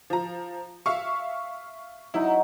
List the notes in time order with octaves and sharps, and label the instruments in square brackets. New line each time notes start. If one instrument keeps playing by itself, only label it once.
[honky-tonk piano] F3 A#5
E5 F5 C#6
[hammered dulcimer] F#3 D#4 [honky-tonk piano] E4